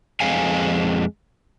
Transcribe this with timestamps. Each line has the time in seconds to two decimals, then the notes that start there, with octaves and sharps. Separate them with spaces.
0.20 F2 G#3 F5 G#5